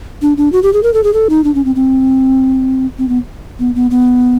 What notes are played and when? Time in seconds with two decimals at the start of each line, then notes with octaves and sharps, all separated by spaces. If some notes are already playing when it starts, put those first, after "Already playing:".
0.22 D4
0.37 D4
0.52 F#4
0.63 G4
0.73 G#4
0.83 A#4
0.94 A4
1.04 G#4
1.14 A4
1.30 D#4
1.44 D4
1.55 C#4
1.65 C4
1.76 C4
2.98 C4
3.09 B3
3.59 B3
3.75 B3
3.91 B3